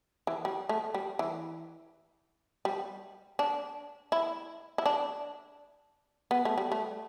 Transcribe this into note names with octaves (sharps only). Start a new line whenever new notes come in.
E3
G3
A3
G3
E3
G3
D4
E4
E4
D4
B3
A3
G3
A3